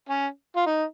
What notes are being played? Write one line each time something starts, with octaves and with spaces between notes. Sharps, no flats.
C#4
F4
D#4